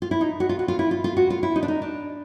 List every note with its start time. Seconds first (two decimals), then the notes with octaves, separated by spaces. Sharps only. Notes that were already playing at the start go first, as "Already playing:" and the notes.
0.02 F4
0.11 E4
0.21 D#4
0.40 F#4
0.49 F4
0.59 F#4
0.68 F4
0.79 E4
0.91 F4
1.04 F4
1.17 F#4
1.30 F4
1.43 E4
1.56 D#4
1.63 D4
1.68 D#4
1.82 D4